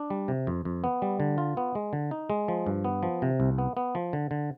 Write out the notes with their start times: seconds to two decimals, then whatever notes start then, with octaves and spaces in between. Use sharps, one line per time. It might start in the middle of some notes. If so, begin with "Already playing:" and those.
Already playing: D4
0.10 G3
0.28 C3
0.47 F2
0.65 F2
0.84 B3
1.02 G3
1.20 D3
1.38 F4
1.57 B3
1.75 G#3
1.93 D3
2.11 D#4
2.30 G#3
2.48 F3
2.66 G2
2.85 B3
3.03 F3
3.22 C3
3.40 C2
3.58 B3
3.77 B3
3.95 F3
4.13 D3
4.31 D3